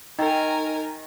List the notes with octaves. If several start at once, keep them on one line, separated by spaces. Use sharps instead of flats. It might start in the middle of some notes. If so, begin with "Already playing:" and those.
D#3 D#4 A#4 G#5 A6